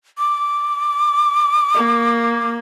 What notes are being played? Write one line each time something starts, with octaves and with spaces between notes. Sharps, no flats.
D6
A#3